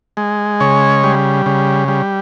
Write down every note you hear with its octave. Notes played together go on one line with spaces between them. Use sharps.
G#3
C#3 C#5
G3
C#3
G3